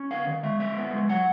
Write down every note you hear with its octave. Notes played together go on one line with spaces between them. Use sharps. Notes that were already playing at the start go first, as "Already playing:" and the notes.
Already playing: C#4
B3 F5
D#3
G#3 E5
F3 E5
B3
G#3
F#3 F#5